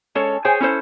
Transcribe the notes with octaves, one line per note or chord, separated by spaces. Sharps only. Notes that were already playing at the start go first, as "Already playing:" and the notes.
G#3 C#4 A4 C#5
G#4 C5 C#5 G5 G#5
C#4 E4 A4 C5